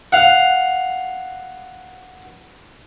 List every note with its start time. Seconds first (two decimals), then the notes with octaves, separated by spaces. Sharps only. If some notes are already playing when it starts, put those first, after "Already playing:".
0.12 F5 F#5